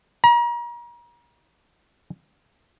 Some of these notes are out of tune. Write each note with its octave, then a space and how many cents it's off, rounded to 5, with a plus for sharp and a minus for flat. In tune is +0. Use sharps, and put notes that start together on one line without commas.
A#5 +35